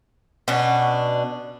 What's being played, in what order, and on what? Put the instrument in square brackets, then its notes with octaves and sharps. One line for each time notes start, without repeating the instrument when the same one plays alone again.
[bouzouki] B2 C#4 D4